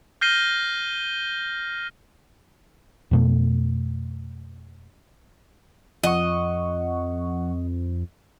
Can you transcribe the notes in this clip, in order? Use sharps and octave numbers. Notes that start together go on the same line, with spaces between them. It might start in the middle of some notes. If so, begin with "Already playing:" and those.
F6 G6 A#6 C7 D#7 G7
F2 B2 A3
F2 F3 D#5 F#5 C#6